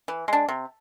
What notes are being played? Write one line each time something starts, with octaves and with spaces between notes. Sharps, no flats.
E3
G#3 D4
C3